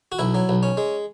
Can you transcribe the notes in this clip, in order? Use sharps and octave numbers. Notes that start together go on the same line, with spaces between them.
F#4
B1 E4
F#3
B1
C#4
G#3